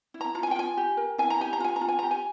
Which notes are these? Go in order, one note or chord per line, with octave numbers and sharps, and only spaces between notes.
E4
A#5
F4 A#5
G#5
G5
F4 G#5
G4
A#4
E4 G#5
A#5
G4 G#5
A#5
F4 G#5
A#5
F4
G#5
G4 A#5
G#5